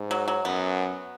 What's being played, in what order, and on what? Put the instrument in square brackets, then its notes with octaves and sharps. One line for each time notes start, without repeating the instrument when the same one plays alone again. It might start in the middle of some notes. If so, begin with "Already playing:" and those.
Already playing: [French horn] G#2
[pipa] F#3
F#3
[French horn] F#2 [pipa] B3